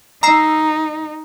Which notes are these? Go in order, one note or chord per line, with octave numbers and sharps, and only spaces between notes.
D#4 A#5 E6 C7